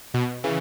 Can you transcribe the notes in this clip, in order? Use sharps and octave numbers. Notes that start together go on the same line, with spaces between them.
B2
C#3 E3